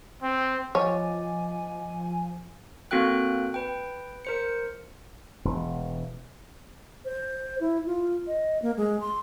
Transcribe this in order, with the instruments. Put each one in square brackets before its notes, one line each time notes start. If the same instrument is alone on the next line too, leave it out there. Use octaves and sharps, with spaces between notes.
[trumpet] C4
[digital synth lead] F3 [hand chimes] F4 D#5 D6 [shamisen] C#5 [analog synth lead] G#5
[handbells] A#3 C4 F#4 A4 G5 F#6
B4 G5
A#4 C5 C#7
[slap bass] E1
[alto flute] C5
E4
F4
D#5
A#3
G#3
C6